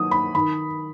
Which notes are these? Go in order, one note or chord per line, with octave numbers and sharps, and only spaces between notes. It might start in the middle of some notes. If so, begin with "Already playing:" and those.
Already playing: D#3 F#3 D#4 D#6
B5
D#3 B5